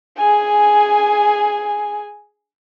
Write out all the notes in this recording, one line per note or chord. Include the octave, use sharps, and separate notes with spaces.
G#4 G#5